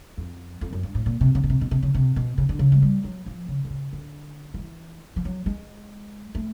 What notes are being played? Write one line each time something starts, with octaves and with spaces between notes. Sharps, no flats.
F2
F2
F#2
G2
A2
A#2
C3
C#3
B2
C3
B2
C3
C#3
C3
B2
C#3
D3
C#3
G#3
G3
F#3
F3
C#3
D3
C#3
D3
F3
E3
F3
F#3
G#3
A3